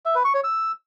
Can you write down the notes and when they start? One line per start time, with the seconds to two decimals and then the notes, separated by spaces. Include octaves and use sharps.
0.05 E5
0.15 B4
0.25 C#6
0.34 C#5
0.44 E6